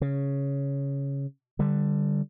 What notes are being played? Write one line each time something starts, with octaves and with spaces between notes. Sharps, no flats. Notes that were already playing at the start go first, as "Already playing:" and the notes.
C#3
D3 G3